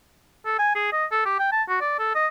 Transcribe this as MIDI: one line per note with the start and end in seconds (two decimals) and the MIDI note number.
0.46 0.59 69
0.59 0.72 80
0.75 0.91 68
0.93 1.05 75
1.12 1.23 69
1.26 1.36 67
1.39 1.49 79
1.52 1.62 81
1.69 1.77 66
1.81 1.95 74
1.99 2.11 69
2.15 2.27 75